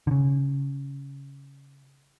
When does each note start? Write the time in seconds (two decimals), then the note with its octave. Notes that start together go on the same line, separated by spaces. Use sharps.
0.07 D3
0.11 C#3